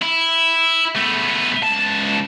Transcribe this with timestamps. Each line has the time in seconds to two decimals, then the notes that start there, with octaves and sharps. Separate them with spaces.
0.02 E4
0.96 A3 B3
1.63 C#2 A5